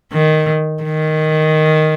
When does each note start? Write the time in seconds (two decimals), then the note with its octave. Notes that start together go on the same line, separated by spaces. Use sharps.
0.13 D#3
0.83 D#3